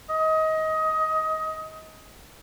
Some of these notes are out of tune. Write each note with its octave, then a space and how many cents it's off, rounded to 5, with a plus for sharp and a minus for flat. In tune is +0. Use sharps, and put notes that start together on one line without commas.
D#5 +20